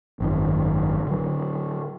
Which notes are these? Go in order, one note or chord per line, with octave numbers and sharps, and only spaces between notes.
G#1 F#2 D#3
D3 F#3